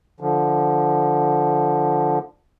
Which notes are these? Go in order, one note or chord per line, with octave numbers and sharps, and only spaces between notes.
D3 F3